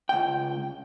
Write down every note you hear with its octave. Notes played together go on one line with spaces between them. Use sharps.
C#2 G5